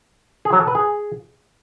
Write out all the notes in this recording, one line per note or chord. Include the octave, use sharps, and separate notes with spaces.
G#4
F#3
A4
B4
G#4